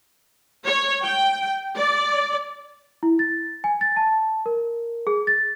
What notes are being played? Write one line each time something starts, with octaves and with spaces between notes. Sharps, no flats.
C#5
G5
D5
E4
A6
G#5
A6
A5
A#4
G#4
A6